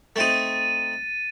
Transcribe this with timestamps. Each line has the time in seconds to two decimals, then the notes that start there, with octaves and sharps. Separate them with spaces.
0.16 A3 C4 D#4 A6 D#7